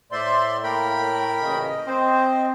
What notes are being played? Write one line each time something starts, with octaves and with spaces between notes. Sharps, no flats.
A2 C5 D5 E5 C6
A#3 A#4 G5 B5
A1 A#2 C#3 D#5
C4 C5